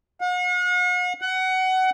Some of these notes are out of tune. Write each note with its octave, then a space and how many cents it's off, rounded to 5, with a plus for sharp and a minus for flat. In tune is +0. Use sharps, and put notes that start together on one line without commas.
F#5 -45
F#5 +20